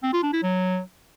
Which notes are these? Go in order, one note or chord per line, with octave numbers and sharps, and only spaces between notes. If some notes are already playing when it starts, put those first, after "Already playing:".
C4
F4
D4
E4
F#3